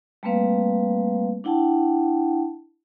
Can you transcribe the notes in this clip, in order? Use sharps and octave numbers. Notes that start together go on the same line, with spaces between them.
G3 A3 A#3 C4 B4 F5
D4 E4 F#5 G5 A5